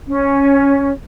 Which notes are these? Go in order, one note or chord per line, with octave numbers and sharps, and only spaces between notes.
C#4